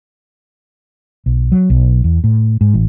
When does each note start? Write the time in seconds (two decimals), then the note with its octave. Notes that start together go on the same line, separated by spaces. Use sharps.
1.26 B1
1.52 F#3
1.70 B1
2.04 E2
2.24 A2
2.61 G#2
2.74 A1